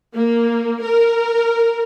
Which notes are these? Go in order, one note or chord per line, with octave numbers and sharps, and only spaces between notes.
A#3
A#4